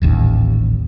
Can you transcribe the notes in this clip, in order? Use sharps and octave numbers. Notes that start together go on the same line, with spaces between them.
D#1 A1 D#2